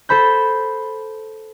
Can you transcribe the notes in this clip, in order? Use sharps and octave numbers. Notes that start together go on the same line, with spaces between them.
A4 C5 B5 G6